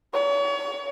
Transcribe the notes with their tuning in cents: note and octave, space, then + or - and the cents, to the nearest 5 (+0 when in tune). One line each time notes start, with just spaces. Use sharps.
C#5 +35